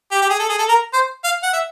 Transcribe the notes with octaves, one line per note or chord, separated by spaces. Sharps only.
G4
G4
G#4
A4
G#4
A4
A#4
C5
F5
F#5
E5